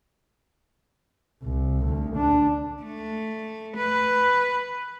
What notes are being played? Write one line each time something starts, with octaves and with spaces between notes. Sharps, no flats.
C2
D2
D4
A3
B4